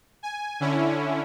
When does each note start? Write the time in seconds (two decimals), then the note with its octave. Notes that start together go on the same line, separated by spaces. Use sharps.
0.23 G#5
0.60 D3 C#4 E4